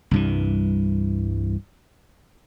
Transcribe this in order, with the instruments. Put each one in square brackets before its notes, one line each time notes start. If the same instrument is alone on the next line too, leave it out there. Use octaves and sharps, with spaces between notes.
[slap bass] C2 G2 E3